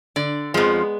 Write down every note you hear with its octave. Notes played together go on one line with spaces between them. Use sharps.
D3 D5
F2 F3 G#3 B3